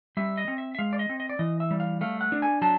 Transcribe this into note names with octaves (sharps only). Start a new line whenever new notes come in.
G3 E5
D#5
C4
E5
E5
G#3 F5
D5
D#5
C4
D#5
D5
E3 D#5
E5
G3
F5
A3 F5
F#5
D4
G#5
F#3 A5